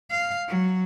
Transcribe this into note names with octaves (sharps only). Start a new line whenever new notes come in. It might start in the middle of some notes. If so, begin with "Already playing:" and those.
F5
F#3